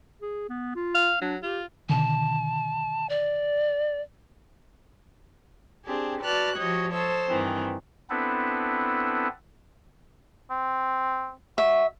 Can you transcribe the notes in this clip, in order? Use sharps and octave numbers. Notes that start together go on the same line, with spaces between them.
G#4
B3
F4
F5
F#3 D4
F4 G4
B2 D3 D#3 A5
D5
C4 D4 G4 G#4
F#4 B4 D5 A5 F6 F#6
F3 F#4 G4 C#5 D#5
A4 C5 C#5 D#5 E6
G2 D#3 E3 C4
B3 C4 D4 E4 A4 B4
C4
F#4 E5